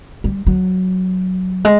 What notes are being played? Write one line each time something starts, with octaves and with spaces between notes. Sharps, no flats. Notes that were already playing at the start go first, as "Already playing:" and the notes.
G3
F#3
G#3